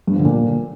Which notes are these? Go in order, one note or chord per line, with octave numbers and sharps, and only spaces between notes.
G2
F3
D3
A#2